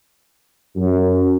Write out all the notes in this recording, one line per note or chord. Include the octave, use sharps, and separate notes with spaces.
F#2